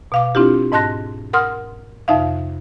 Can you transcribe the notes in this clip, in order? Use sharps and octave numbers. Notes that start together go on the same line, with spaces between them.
B2 F5 D6
C4 D4 E4 F4 G4
G#2 D#5 A5 C6 F#6 A#6
A#4 F#5 C6 D#6 F6
F2 C3 D#4 E5 F5